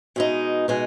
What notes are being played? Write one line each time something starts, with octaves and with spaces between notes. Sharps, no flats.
B2 G#3 D#4
B2 G#3 D#4